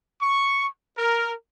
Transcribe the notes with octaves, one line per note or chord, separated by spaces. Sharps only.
C#6
A#4